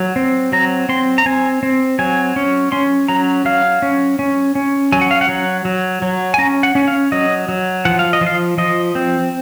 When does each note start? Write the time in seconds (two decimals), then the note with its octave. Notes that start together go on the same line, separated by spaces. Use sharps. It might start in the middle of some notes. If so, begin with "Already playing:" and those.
Already playing: F#3
0.16 C4
0.52 F#3 A#5
0.89 C4 C6
1.18 A#5
1.26 C4 G#5
1.63 C4
1.99 F#3 G#5
2.36 C#4
2.72 C#4 C6
3.08 F#3 A#5
3.45 F#3 F5
3.82 C#4
4.19 C#4
4.55 C#4
4.92 F#3 G#5
5.01 F#5
5.11 F5
5.21 F#5
5.29 F#3
5.65 F#3
6.02 F#3
6.34 G#5
6.38 C#4 A#5
6.63 F#5
6.75 C#4
6.88 F5
7.12 F#3 D#5
7.49 F#3
7.85 F3 F#5
7.99 F5
8.13 D#5
8.21 F3
8.27 F5
8.58 F3 D#5
8.95 C4